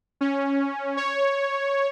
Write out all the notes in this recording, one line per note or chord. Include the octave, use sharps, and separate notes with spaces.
C#4
C#5